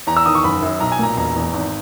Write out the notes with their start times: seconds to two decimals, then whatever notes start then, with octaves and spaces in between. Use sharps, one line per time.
0.07 E2 A#5
0.17 E6
0.26 D#3 D#6
0.35 C#6
0.44 F#1 B5
0.62 F#2
0.80 B1 A#5
0.92 G#5
0.99 A#2 A#5
1.17 E1 A#5
1.36 E2
1.54 G#1